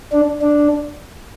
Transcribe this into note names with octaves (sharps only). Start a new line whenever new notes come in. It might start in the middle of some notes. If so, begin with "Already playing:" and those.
D4
D4